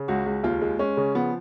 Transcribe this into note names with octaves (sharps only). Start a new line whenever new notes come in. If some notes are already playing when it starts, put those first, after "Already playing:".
Already playing: C#3
C#2 F#4
C#2
D#2 F4
G#3
G#3 C#4
C#3
F3 B3